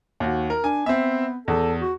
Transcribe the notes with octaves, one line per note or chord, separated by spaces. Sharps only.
D#2 F#4
A#4
D4 G#5
B3 C4 E5
E2 A4
F#4